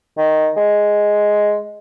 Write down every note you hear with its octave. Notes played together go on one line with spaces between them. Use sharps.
D#3
G#3